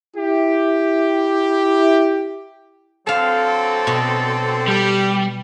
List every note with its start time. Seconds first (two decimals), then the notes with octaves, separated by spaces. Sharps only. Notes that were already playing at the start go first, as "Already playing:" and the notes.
0.16 E4 G4
3.07 D3 F#3 C4 A4 F5 A5
3.87 B2
4.68 G3 G4